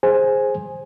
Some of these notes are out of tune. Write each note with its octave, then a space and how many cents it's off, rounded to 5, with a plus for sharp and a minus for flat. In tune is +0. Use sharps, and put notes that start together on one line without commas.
G#4 +0 C5 +10 G#5 +0